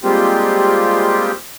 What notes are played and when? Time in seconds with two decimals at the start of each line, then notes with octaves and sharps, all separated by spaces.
0.04 G3 G#3 A#3 C4 F4 G4